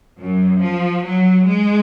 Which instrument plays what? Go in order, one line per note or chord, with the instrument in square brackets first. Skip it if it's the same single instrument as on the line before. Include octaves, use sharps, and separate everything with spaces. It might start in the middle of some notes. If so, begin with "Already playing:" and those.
[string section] F#2
F3
F#3
G#3